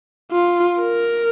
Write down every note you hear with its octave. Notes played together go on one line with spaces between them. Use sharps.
F4
A#4